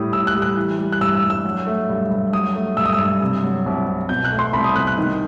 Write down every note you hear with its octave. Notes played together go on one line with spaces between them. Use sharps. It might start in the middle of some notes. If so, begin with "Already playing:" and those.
Already playing: A2 G3 D#6
A2 E6
F#6
G3
F#6
E3
G3
F#6
G2 E6
E6
G2
E6
F#3
A3
G2
G2
F#3 D#6
A3
G2 E6
D#6
E6
G2
C3
F#3
C2
C2
B2 G6
F#6
A3
C6
C2 B5
D#6
C2 F#6
F#6
D#3